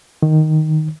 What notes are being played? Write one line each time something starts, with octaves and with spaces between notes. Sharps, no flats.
D#3